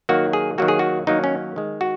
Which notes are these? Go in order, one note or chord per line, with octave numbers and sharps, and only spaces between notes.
D#3 F#3 A#3 F#4
G#4
D#3 F#3 A#3 F#4
G#4
F#4
D#3 F#3 A#3 D#4
C#4
D#3 G#3
F#4